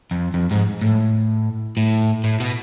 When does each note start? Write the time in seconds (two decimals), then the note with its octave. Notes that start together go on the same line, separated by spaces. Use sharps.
0.11 F2
0.34 F2
0.51 G#2
0.82 A2
1.77 A2
2.24 A2
2.40 B2